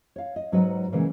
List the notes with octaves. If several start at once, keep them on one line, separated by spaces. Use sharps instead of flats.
C#5 F5
D#5
G#2 F#3 F#4 A4 B4 D#5
A#2 C#3 E3 G#3